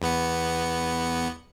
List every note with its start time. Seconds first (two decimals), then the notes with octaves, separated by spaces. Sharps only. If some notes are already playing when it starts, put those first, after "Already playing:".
0.02 E2 B3 C#7